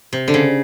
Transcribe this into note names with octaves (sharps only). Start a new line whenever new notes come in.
C3
D3
C#3